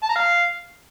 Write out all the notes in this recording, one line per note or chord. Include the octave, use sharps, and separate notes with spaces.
A5
A#5
F5